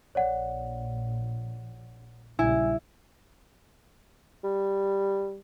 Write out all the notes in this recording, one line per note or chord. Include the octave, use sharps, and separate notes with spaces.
A#1 C#5 D5 F#5
A#1 C#3 G3 E4 G#5
G3